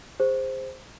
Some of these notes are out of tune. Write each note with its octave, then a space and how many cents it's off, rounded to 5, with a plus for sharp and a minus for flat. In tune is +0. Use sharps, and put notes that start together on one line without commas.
G#4 -30 C5 +0